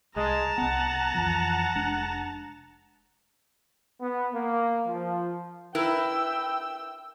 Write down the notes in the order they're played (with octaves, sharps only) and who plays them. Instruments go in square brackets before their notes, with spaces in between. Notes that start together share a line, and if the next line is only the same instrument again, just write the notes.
[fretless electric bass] C2 [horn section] G#3 [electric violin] A5 A#5
[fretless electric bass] C2 B3 [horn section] F#5
[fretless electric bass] F2 E3 F3
F1 G#3 D4
[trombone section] B3
A#3
F3
[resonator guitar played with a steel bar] E4 A#4 B4 [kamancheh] G5 E6